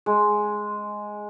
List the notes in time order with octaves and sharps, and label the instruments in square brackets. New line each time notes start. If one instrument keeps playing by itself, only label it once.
[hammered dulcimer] G#3